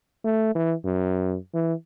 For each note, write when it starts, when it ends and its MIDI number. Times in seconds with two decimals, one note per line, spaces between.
0.24 0.54 57
0.55 0.74 52
0.85 1.36 42
1.54 1.73 52